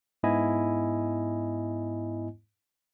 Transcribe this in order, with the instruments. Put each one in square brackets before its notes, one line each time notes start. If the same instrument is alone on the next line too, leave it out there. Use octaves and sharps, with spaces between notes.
[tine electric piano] G#2 B3 E4 D#5 G#5